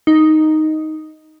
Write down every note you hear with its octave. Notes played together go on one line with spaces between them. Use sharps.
D#4